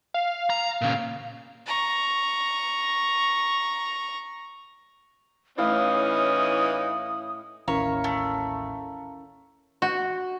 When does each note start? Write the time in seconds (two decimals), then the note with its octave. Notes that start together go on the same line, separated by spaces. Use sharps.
0.14 F5
0.50 A#5
0.81 A#2 C#3
1.67 A#5 C#6
5.58 A2 E3 C#4 D#4 F5 D#6
7.68 A1 D#2 C#4 E4 A#4 C#5 F5 A#5
8.04 A3
9.82 F#4